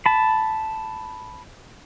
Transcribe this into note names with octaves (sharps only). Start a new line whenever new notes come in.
A5 B5